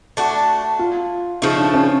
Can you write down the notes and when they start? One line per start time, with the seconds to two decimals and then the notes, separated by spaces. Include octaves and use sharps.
0.17 A3 D4 F#4
0.79 F4
1.42 C#3 F3 A3 D#4
1.57 D4
1.73 C#4